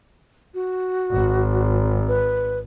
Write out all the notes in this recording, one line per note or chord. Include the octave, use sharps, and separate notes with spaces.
F#4
G#1
B4